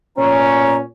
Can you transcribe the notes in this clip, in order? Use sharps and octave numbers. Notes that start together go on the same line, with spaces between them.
A#2 B3 C#4 A#5